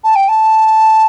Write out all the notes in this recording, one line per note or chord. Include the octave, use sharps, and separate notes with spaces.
A5
G5
A5